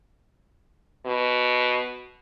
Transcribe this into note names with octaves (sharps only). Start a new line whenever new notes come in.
B2